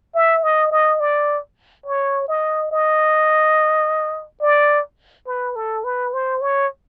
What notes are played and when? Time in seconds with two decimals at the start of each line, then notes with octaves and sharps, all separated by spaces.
0.15 E5
0.43 D#5
0.71 D#5
1.00 D5
1.86 C#5
2.28 D#5
2.71 D#5
4.42 D5
5.27 B4
5.56 A4
5.84 B4
6.13 C5
6.41 C#5